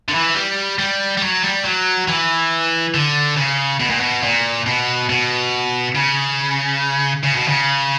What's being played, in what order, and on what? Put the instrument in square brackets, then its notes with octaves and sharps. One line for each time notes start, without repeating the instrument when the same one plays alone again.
[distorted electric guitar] D3
E3
G3
G3
G3
F#3
G3
F#3
E3
D3
C#3
B2
A#2
B2
A#2
B2
B2
C#3
C#3
B2
C#3